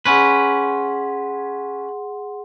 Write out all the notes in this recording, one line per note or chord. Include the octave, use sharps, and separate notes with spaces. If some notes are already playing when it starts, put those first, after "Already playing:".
C#4 G#4 B4 F#5 C6